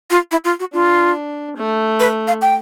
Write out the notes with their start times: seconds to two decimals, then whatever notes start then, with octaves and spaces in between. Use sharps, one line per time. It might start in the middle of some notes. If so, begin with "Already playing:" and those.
0.10 F4
0.31 E4
0.44 F4
0.60 F#4
0.73 D4 F4
1.57 A3
2.00 B4
2.27 F5
2.42 G5